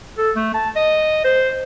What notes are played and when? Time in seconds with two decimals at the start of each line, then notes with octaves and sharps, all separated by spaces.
0.18 A4
0.36 A3
0.54 A5
0.76 D#5
1.25 C5